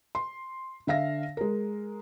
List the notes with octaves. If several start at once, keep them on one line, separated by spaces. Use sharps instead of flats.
C6
D3 E5 F5 A#6
G#3 A#4